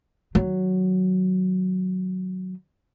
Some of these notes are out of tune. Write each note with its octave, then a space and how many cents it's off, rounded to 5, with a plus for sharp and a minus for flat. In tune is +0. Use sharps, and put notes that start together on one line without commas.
D#3 +0 F#3 +0